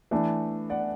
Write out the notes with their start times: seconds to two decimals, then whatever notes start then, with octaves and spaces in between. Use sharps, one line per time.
0.11 E3 A3 D4
0.70 D5 F#5